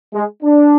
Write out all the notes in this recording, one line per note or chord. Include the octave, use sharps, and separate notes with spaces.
G#3
D4